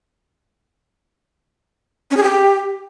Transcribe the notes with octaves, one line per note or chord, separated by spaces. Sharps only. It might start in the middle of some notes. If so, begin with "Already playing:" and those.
C#4
G#4
G4